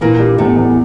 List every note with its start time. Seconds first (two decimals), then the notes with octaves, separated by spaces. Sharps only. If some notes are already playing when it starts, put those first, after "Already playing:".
0.01 A#2 E3 A#3
0.19 G3
0.38 E2 A2 A3
0.56 E2